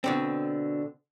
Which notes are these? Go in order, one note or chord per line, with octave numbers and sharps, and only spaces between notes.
B2 D3 C4